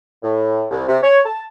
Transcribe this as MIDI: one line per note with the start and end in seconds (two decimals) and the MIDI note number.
0.23 0.65 45
0.71 0.84 36
0.88 0.97 48
1.03 1.19 73
1.25 1.43 81